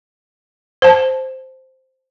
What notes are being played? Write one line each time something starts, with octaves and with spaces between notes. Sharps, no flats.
C5 A5